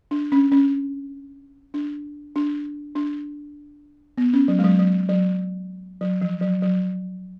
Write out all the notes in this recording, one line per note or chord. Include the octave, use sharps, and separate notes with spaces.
D4
C#4
C#4
D4
D4
D4
B3
C#4
F#3
G#3
F#3
F#3
F#3
F#3
F3
F#3
F#3